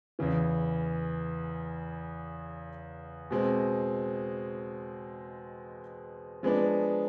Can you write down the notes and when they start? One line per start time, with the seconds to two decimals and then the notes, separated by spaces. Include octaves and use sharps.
0.19 E2 C#3 E3
3.31 B2 G#3 C4
6.43 F3 G#3 B3 D4